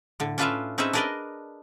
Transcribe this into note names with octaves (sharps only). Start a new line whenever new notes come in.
A2 D3
C#4 D4 F4 B4 E5 F5
C4 C#4 D#4 G#4 B4 E5
D4 G#4 A#4 B4 D5 D#5